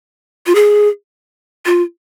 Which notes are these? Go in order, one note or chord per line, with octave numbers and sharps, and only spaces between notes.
F4
G#4
F4